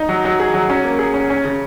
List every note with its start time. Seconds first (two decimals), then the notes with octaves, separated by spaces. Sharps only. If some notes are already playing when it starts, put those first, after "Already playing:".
Already playing: D#4
0.09 F#3
0.25 F#3
0.40 G#4
0.54 F#3
0.70 C#4
0.84 A#3
0.99 G#4
1.14 C#4
1.30 C#4
1.45 C#3